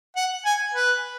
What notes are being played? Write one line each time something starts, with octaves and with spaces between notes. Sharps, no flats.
F#5
G#5
B4